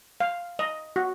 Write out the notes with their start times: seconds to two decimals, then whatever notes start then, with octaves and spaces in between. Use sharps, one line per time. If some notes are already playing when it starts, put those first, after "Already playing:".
0.20 F5
0.59 D#5
0.96 F#4